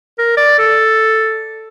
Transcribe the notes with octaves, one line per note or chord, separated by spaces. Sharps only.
A#4
D5
A4